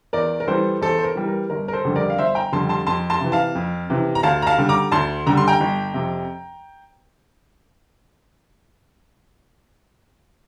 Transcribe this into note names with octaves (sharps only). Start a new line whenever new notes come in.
E2 A#4 D5
A#4
E3 G3 A4 C5
E2 A4 C5
C5
A#4
E3 G3
A#4
G1 A#4
A#4
A4 C5
F2 D3 G3
A#4 D5
F5
G1 C5 E5
G5 A#5
F2 D3 G3 A5 C6
A5 C6
F2 A5 C6
A5 C6
C3 E3
F5 A5
F2
C3 E3
A#5
D2 F5 A5
A#5
F5 A5
D3 G3
A#5 D6
D2 A5 C6
D3 G3 A#5
C6
G5 A#5
G1
F2 C3